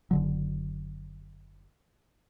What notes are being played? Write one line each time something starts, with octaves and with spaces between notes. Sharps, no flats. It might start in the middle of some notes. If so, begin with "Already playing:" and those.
F#1 D3 F#3